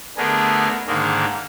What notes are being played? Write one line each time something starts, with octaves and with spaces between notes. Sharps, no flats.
D3 A3 B3 D4 G#4 A#4
G#2 D3 D#3 G#3 A#3